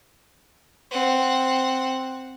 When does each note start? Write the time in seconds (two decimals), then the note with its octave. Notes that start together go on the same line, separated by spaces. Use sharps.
0.91 C4 F#5